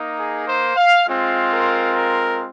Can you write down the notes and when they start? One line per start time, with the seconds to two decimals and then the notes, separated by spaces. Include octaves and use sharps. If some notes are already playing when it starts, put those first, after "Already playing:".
Already playing: A#3 D#4
0.16 G#4
0.46 C5
0.76 F5
1.05 G#3 C4 F4
1.50 A#4
1.95 A#4